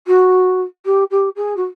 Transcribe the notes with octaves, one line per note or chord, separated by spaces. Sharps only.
F#4
G4
G4
G#4
F#4